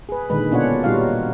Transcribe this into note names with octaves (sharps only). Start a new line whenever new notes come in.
G#4 B4
A#2 D3 D#3 G#3 B4
B2 C#4 D4 F4 C#5 F#5
A#2 G3 D#4 F4 F#4 F5